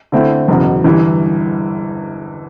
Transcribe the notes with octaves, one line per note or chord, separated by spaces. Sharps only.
D3 A3 C4 E4
F#1 E2 B2
G1 G2 E3